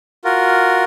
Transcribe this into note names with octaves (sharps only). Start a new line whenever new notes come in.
F4 F#4 A#4